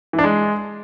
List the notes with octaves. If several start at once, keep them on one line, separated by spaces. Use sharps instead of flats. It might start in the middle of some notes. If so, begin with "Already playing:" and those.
E3
D4
G#3